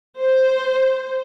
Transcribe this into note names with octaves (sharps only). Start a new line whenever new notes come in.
C5